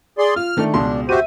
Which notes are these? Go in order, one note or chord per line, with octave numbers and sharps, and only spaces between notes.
G#4 D5 C6
F4 F6
D#3 A3 D4
C#2 B2 D4 C6
F#4 G4 C5 E5 D#7